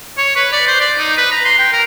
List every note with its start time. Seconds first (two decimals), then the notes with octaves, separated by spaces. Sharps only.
0.18 C#5
0.36 B4
0.52 D5
0.67 C5
0.81 D5
0.98 D#4
1.17 B4
1.32 A#5
1.45 C6
1.59 G5
1.73 A#4